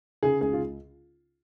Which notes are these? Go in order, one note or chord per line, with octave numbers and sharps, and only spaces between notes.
C#3 G#4
C#2 G#4
F4